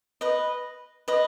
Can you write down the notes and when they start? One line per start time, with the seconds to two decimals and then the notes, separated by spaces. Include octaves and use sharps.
0.21 B4 D#5
1.08 B4 D#5